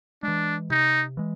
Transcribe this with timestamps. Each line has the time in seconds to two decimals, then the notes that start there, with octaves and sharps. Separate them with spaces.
0.23 E3 G#3 D4
0.70 C3 D#4
1.17 E3 G#3